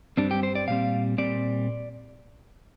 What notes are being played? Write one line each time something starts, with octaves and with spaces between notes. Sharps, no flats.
G2 G3 C4 D4
G4
C5
D5
A#2 G3 C4 F5
A#2 G3 C4 D5